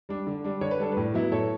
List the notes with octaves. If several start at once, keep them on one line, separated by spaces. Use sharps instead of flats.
G3 D4
D3
G3 D4
D3 C#5
B4
G3 D4 A4
A2 B4
F#3 B3 E4
A2 A4 C#5